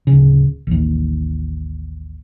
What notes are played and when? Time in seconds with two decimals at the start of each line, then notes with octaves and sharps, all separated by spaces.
0.07 D1 C#3
0.67 A1 D#2